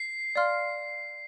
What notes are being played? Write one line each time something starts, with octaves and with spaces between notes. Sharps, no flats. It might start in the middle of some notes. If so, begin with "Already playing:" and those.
Already playing: C7
D5 F5 C6 F6